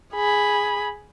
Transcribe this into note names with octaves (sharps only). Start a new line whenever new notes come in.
G#4 B5